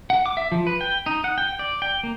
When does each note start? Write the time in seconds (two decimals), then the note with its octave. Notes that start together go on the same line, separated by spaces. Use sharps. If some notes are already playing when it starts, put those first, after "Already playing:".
0.10 F#5
0.26 D6
0.37 E5
0.52 F3
0.67 B4
0.81 G5
1.06 D#4
1.24 F#5
1.38 G5
1.59 D5
1.82 G5
2.03 A#3